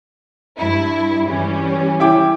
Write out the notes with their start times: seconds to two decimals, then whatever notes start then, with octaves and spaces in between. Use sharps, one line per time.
0.58 G2 E4
1.29 E3 G3 C#4
2.00 E4 G5 D6